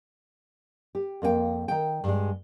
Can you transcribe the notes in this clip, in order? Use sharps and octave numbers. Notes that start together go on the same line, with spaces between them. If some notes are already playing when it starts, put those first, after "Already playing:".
G4
F2 A#3 F4 G5
D#3 G5
G2 G#3